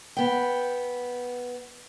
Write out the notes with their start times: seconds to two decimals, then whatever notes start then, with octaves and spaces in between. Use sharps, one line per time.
0.17 B3 G5